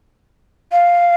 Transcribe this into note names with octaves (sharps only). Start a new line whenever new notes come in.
F5